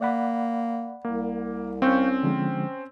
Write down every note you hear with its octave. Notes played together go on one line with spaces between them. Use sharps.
A#3 D5 F#5 B5
C2 A#3
C4 C#4 F5 C#6 G6
D3 F3 G#3